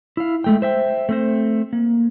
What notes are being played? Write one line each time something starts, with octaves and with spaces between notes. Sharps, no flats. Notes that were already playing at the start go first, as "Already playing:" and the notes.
E4 F5
G#3 A3 G5
C5 E5 G5
A3 C4 C5
A#3